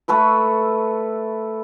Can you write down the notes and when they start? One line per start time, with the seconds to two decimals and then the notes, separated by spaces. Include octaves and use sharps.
0.08 A3 A4 B4 E5